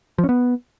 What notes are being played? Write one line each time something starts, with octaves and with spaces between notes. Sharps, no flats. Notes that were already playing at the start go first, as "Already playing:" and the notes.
F3
C#4
B3